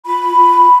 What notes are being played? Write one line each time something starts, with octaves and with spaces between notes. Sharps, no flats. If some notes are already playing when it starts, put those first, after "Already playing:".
F4 B5
F4